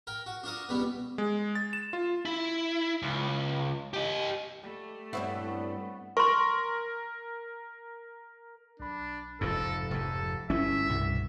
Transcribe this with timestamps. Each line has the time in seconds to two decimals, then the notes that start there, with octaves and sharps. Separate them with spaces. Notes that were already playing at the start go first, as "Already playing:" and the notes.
0.07 A#4 G5
0.26 F#4
0.43 D4 F4 F#4 A#4 D#6
0.69 C#2 B2 G3 B3
1.18 G#3
1.55 A6
1.73 E7
1.93 F4
2.25 E4
3.02 C#2
3.93 G4 D#5
4.63 G3 A3
5.13 G2 B3 C4 E4 C#5
6.17 A#4 C6 C#6
8.80 B1 D4 B5
9.41 F1 F2 G#2 A4
9.91 F1 G#2 A4
10.50 G1 A3 C#4 E4 E5
10.89 C2 G2 B2